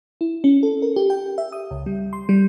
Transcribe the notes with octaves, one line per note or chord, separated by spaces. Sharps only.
E4
C#4
A4
A#4
G4
G5
E5
D#6
C#2
G3
C6
G3